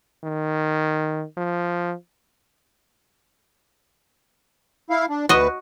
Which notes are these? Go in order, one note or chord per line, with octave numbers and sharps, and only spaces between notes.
D#3
F3
E4 F5
D4
D2 F#4 B4 D#5